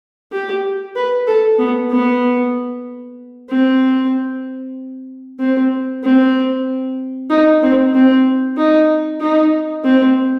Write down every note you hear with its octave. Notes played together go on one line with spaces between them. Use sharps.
G4
B4
A4
B3
B3
C4
C4
C4
D#4
C4
C4
D#4
D#4
C4